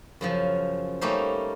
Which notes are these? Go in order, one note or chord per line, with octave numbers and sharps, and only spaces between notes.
F#2 C#3 F3
G3 A3 A#3 C#4 D#4 C5